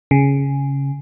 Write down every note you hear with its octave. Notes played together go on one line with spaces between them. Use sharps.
C#3